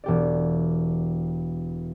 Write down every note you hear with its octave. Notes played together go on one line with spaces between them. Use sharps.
E1 G4 D5